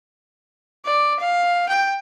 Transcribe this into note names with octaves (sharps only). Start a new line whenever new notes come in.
D5
F5
G5